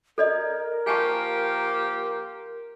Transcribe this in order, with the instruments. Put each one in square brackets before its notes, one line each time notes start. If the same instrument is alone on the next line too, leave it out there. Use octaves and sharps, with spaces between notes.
[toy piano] A4 D5 D#5 [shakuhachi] A#4
[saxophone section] F3 A#3 G4 [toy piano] G#5 A5 C#6